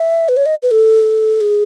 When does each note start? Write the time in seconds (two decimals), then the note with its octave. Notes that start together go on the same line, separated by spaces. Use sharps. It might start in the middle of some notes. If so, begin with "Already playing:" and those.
Already playing: E5
0.29 B4
0.37 C#5
0.46 D#5
0.63 B4
0.71 A4
1.41 G#4